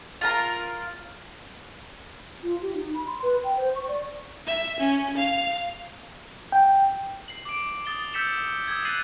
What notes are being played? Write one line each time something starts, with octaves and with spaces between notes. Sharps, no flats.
F4 A#4 A#5
F4
G4
D#4
B5
C6
B4
G5
C5
C#6
D5
E5
C#4
F5
G5
C7 F#7
D6 D7
D#6 A6 G7
E6 G6 A6 B6 C#7 E7
D#6 E6 G#6
F#6 G#6 A6 C7 D#7 F#7